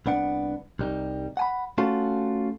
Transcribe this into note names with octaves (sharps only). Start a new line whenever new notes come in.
C2 B3 D4 F#5
C2 G3 D#4
F#5 G#5 B5
A3 C#4 F4 F#4 A4